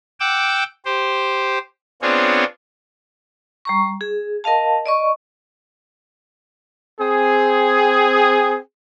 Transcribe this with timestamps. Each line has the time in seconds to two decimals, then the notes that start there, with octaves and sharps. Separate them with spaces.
0.20 F#5 G5 D6 E6
0.85 G4 C5
2.02 B3 C4 D4 F4 G#4 C#5
3.65 G3 A#5 C#6
4.01 G#4
4.44 A#4 D#5 F5 A5
4.86 D5 D#5 C#6
7.00 C4 G#4